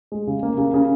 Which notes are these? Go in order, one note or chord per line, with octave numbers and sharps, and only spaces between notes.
G#3
C#3
A#3
C#3
C#3